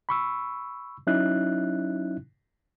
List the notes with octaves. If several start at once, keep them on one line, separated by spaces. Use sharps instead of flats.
B5 C#6 E6
F#3 C#4 D#4 E4 E5 F#6